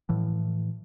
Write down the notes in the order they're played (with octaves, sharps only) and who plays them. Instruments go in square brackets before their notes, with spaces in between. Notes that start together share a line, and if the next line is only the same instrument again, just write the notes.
[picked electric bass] A2 E3 F3